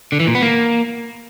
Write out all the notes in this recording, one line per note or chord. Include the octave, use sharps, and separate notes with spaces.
D3
E3
A#2
B3
A#3